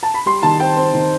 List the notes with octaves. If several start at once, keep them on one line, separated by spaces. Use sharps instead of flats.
A5
B5
G3 C6
D#3 A5
C4 G5
C4
D#3